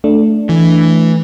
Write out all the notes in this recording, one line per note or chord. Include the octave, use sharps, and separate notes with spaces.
A3 D4
E3